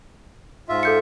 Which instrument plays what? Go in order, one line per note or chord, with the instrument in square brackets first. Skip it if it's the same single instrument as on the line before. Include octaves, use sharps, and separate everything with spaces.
[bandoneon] G#2 F4 E5
[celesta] A4 G6 C#7